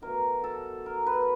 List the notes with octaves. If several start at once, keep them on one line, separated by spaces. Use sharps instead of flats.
B2 F#3 A3 A#4
A4
A#4
B4